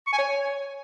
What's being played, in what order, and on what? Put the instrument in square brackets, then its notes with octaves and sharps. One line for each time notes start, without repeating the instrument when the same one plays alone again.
[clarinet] C#6
G#5
C#5